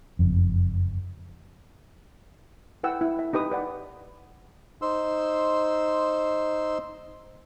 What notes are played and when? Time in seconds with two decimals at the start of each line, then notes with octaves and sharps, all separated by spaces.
0.19 F#1 F2
2.83 E4 B4 F#5 G5 E6
3.01 E4
3.19 E5
3.33 D#4 G4 B4 D#6
3.51 B4 D5 F#5
4.82 D#4 C5 C6 E6